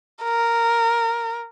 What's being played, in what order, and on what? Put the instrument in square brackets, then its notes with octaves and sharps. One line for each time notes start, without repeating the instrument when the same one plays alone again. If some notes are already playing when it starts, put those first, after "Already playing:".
[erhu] A#4